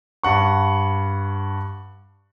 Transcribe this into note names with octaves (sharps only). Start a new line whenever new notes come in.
G2 F#5 C#6